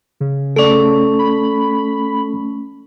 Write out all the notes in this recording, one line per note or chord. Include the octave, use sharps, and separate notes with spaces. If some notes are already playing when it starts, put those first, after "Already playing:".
C#3
A3 C#4 A4 D5
B5